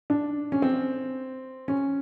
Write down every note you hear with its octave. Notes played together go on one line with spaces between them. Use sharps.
D4
C#4
C4
C#4